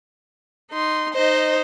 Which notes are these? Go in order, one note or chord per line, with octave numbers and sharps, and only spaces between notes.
D#4 C6
D#4 C5 D#5